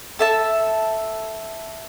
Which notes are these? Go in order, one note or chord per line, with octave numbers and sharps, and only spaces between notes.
A4 E5 A5